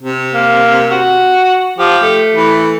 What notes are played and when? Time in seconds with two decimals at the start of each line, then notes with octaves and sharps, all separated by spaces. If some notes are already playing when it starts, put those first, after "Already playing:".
0.02 C3
0.34 A#3
0.91 F#4
1.79 F3 G4
2.03 A3
2.36 E3